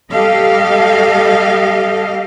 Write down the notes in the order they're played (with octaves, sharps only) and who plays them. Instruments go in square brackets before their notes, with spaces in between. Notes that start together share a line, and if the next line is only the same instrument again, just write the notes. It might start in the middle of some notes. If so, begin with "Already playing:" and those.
[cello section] G3 G4 A4 D#5 F5